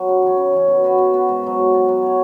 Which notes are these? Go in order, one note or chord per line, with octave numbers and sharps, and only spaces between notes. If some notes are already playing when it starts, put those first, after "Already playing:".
Already playing: F#3 B3
C#3
E3 C#4
C#3
E3 C#4
B2
B3 F#4 B4
B2
B3 F#4 B4
G#2
F#3 B3
G#2
F#3 B3
F#3
E4 C#5